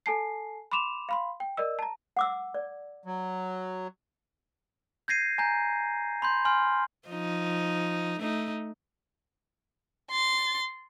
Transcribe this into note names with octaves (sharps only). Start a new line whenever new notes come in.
A4 G#5 A5 C7
B5 C6 D6 E7 F7
F5 B5 C6
G5
A#4 D5 D#5 E6
A5 A#5
F#5 D6 E6
D5
F#3
G6 G#6 A#6 C7 D#7
G#5 A#5 G6
B5 C6 G6
G#5 C6 F6
F3 D#4
A3 D#4
C6 A6